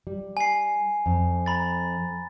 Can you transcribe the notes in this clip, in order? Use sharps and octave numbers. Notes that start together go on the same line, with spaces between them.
G3
G#5 C7
F2
A#5 B5 A6